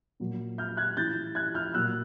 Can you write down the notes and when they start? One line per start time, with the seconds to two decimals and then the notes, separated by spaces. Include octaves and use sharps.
0.20 A#2 F#3
0.58 F6 G6
0.77 F#6 G#6
0.97 A2 E3 G6 A6
1.35 F#6 G#6
1.55 F6 G6
1.74 A#2 F#3 E6 F#6